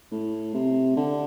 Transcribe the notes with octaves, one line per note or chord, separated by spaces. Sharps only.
A2
C3
D3